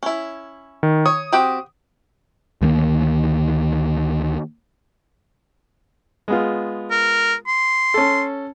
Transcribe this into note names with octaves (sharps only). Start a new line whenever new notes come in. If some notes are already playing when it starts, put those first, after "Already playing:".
C#4 E4
D#3
C#5 D#6
C4 F#4 G4
D2 D#3 G#3 A#3
G#3 B3 F4
A#4
C6
C#4 A4